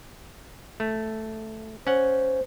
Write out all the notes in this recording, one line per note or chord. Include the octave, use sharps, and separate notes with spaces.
A3
C#4 C5 F#5